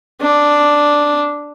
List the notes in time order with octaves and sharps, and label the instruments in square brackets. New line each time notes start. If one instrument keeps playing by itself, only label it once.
[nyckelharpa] D4